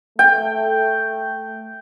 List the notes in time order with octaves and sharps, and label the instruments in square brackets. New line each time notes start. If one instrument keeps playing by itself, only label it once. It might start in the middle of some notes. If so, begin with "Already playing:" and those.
[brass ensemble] A3 [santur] G5